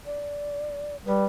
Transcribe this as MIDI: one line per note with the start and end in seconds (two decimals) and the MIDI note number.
0.06 0.97 74
1.06 1.26 55
1.06 1.26 71